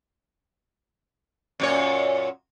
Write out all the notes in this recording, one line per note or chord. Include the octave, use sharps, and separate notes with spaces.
F#2 A#2 C#5